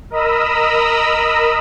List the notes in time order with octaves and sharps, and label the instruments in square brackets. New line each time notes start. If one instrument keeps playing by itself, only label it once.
[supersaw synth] A#4 D#5 A#5 B5 D#6 E6